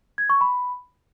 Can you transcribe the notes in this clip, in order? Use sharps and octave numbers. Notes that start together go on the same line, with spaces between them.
G#6
C#6
B5